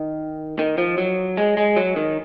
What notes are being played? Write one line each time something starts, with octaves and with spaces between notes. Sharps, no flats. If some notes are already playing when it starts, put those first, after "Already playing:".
Already playing: D#3
D#3
F3
F#3
G#3
G#3
F#3
D#3